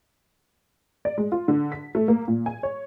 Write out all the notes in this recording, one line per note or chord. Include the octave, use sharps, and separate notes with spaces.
D5
G#3
F4
D3
B6
A3
A#3
A#2
G#5
C#5